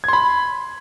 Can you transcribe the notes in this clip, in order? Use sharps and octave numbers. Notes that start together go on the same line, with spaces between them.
B5 C6 G#6